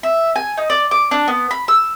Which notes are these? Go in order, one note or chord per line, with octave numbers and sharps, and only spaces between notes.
E5
G#5
D#4
D5
D6
D4
B3
B5
E6